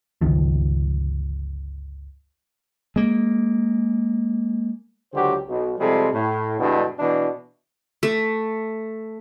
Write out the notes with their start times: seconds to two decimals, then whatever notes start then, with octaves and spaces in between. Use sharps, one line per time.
0.21 G1 C#2 D#3 F3
2.96 G#3 A#3
5.14 C#2 D3 F#3 F#4 G4 C5
5.48 B1
5.78 C3 F3 G3 G#3 A4
6.13 A2
6.60 G2 B2 D3 G3 G#3 E4
6.99 B2 E3 D4 E4
8.03 A3